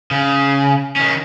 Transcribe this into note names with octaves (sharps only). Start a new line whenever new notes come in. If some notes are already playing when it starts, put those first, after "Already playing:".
C#3
D#3 C#4